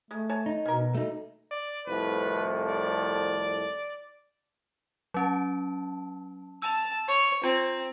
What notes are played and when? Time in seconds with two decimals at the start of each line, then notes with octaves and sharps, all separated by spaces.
0.11 G#3 A3
0.29 C#5 G#5 A5
0.46 D#4
0.65 B2 C#4 A#4
0.95 A3 D#4
1.51 D5
1.87 C2 F2 A2 B4
2.70 D5
5.14 F#3 C#4 A5
6.62 A5 E6 F7
7.08 C#5
7.43 C4 F4